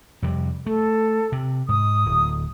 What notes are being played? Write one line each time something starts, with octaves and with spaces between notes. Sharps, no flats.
F2 C3 G3
A3 A4
C3
G#2 D#6
D1